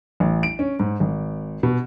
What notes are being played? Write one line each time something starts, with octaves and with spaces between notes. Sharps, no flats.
A1
D7
C#4
G#2
G#1
B2